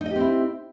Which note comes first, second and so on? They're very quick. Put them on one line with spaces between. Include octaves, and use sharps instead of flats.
D#4 D#5 G4 C4 E4